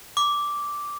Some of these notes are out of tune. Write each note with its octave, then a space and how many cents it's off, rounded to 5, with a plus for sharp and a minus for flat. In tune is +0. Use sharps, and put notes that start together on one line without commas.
D6 -5